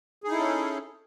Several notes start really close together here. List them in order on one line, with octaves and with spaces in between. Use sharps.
G#4 D#4 E4 A4 C#4